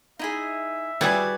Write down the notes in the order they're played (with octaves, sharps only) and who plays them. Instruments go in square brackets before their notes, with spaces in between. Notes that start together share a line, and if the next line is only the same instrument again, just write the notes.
[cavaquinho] D#4 E4 G#4 [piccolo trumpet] E5
[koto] G3 E4 G#4 [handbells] F#4 B4 G#6 [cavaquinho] D5